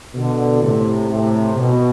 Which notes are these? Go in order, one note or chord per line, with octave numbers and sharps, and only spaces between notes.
B2 D3
A2 C3
A2 C3
B2